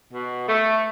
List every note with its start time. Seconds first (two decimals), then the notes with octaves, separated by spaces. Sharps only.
0.13 B2
0.49 A3